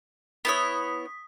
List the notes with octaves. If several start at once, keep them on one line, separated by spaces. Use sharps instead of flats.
B3 E4 C#5 D#6 B6